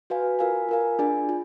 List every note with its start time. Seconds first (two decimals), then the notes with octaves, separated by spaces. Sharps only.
0.10 F#4 B4 F5 G#5
0.39 F4 A#4 F5 G#5
0.69 F4 A#4 F5 G#5
0.99 D4 F4 G#4 D5 G#5
1.29 F4